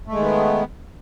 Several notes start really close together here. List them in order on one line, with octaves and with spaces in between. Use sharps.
A3 G#3 D#3 B3